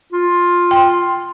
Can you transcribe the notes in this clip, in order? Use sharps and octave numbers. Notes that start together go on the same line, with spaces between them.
F4
G5 C6